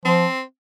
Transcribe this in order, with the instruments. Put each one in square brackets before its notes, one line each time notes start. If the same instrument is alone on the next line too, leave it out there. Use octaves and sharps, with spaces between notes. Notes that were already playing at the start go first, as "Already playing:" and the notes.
[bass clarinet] F3 [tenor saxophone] C4